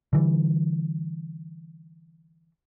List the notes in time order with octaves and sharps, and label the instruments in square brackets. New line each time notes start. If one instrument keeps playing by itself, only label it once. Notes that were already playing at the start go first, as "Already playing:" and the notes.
[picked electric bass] D3 E3 G3